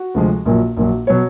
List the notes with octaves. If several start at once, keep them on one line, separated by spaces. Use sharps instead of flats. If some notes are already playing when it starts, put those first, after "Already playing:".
Already playing: F#4
D2 C3 F3 G#3
A#1 A#2 F#3
A#1 A#2 F#3
B2 F#3 C#5